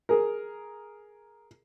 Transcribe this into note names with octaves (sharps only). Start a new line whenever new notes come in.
G#4 A#4